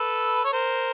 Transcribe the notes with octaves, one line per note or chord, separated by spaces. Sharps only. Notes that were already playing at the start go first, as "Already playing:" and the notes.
Already playing: A4 B4
C#5
A#4 C5